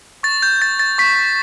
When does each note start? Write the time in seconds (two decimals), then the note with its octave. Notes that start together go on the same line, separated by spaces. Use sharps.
0.23 C#6 A6
0.42 G6
0.61 G6 A6
0.79 A6
0.98 C#6 B6